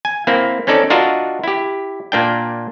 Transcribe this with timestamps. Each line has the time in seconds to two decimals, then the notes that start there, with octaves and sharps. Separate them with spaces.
0.05 G#5
0.27 A#3 C4 E4
0.67 C4 C#4 D#4 A4 D5
0.90 D4 F4 F#4 A#4 D#5 E5
1.44 E4 G4
2.12 A#2 A#3 D4 G5